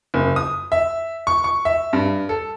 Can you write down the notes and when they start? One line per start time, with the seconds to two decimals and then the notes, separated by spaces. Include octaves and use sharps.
0.14 F#1
0.36 D#6
0.72 E5
1.27 C#6
1.44 C#6
1.65 E5
1.93 G2
2.29 A4